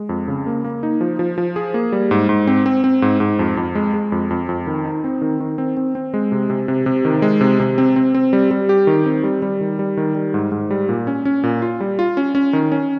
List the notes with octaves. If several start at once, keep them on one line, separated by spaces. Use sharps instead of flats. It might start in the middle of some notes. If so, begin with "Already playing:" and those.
Already playing: G#3
F2
C#3
A#3
A#3
D#4
F3
F3
F3
G#4
A#3
G3
G#2
G#2
C4
C4
C4
G#2
G#2
F2
F2
G#3
G#3
F2
F2
F2
D#3
D#4
C4
D#3
D#3
C4
C4
C4
G#3
C3
C3
C3
C3
D#3
G#3
C3
C3
C4
C4
C4
G3
G3
G4
D#3
C4
G3
G3
D#3
G3
D#3
G3
G#2
G#2
G3
A#2
C#4
C#4
A#2
F4
G3
F4
C#4
C#4
D#3
C#4